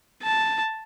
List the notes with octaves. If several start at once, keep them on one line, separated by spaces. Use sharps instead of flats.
A5